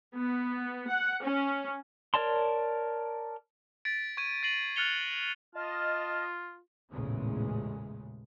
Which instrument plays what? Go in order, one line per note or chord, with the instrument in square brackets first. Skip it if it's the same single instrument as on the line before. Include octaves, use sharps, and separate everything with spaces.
[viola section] B3
F#5
C#4
[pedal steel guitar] A#4 C#5 D5 A5 C6
[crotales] A6 B6 D7
C#6 G#6 D#7
A6 A#6 C7 D#7 F#7
F6 F#6 A6 C#7 F7 G7
[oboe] F4 [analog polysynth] D#5 [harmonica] A5 F6
[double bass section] A1 E2 A#2 C#3 G#3 A3